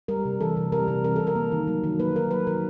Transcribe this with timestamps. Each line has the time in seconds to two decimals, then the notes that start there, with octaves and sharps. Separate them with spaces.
0.08 G3 A#4
0.25 C3
0.41 E3 A4
0.57 C3
0.72 G3 A#4
0.88 C3
1.04 E3 A#4
1.16 C3 A4
1.27 A#4
1.36 A#3
1.52 D#3
1.68 F#3
1.84 D#3
1.99 A#3 B4
2.16 D#3 A#4
2.31 F#3 B4
2.47 D#3 A#4